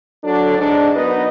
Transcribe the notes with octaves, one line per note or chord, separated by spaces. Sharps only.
F#3 D4 A4
G#2 D4
F#3 B3 D#4 A#4 B4 D#5